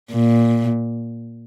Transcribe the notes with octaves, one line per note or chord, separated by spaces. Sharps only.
A#2